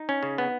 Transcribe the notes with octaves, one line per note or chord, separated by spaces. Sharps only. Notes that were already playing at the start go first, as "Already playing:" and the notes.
Already playing: D#4
C#4
C#3
B3